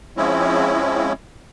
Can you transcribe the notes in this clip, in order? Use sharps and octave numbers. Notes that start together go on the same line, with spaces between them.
F3 G#3 C4 C#4 E4